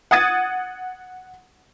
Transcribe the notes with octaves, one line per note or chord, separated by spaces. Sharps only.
F#5 D#6 G#6 A6 D#7